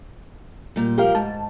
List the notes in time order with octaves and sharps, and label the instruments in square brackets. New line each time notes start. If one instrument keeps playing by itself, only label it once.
[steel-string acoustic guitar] A#2 G3
[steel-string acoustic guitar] F3 G3 A#4 [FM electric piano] G4 F5
[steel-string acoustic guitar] G#2 [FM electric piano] A5